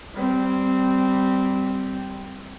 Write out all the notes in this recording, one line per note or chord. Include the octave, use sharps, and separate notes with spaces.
G3 C4